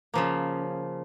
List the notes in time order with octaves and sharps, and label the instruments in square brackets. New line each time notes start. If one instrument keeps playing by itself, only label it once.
[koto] C#3 F3 A#3